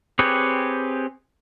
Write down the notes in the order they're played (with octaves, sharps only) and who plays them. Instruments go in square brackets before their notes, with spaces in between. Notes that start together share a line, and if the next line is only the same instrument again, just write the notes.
[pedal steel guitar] C4 G4 G#4 B4 C#5